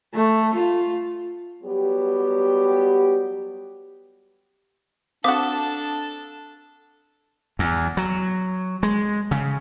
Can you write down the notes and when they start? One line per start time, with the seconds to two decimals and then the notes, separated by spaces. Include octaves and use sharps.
0.14 A3
0.55 F4
1.63 F#3 G3 B3 G4
5.24 C4 D4 F#4 A4 F5 A5 D6 D#6
7.59 E2
7.97 F#3
8.83 G#3
9.31 C#3